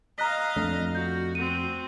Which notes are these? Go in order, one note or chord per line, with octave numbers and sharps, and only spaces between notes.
D#5 F5 A#5 F#6 B6
F2 A3 D4
F#4 G6
C4 F#4 D#7